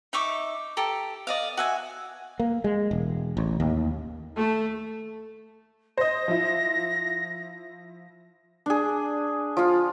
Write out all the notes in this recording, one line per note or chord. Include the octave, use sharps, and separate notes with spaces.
D#4 E5 C#6 D6
G4 A4 A#5
D5 D#5 F5
F#4 E5 G#5
A#3
G#3
E1
A1
D#2
A3
C5 D#5 A#6
F3 E4
D4 G#4
F3 F4